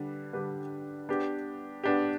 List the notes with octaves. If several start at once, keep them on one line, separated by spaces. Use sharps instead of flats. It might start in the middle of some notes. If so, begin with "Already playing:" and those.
Already playing: D3 G3 D4 B4
D3 G3 D4 G4 B4
B3 D4 G4
B3 D4 G4